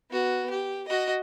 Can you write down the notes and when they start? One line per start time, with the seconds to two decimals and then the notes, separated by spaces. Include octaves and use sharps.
0.11 B3 F#4
0.50 G4
0.88 F#4 D#5